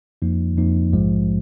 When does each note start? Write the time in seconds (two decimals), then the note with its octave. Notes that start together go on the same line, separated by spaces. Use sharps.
0.22 F2 F3 A#3 D#4
0.57 F2 F3 A#3 D#4
0.93 A#1 G#2 F3 G#3